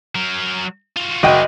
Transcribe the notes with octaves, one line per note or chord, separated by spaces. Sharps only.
F#3 A#4
F4 F#4
F#1 F#4 G#4 D5 D#5 G5